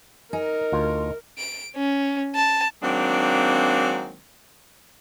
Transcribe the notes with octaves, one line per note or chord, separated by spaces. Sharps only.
D#4 A#4 G#5
D2 F4
D7
C#4
A5
D#3 F#3 G#3 A#3 C4 D4